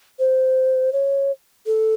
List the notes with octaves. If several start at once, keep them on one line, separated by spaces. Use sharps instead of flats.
C5
C#5
A4